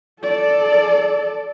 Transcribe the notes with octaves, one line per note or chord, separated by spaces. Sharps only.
A4 D5